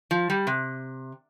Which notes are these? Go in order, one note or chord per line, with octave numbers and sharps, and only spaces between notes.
F3
G3
C3